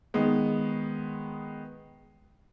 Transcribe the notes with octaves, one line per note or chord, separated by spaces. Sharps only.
D#3 G#3 B3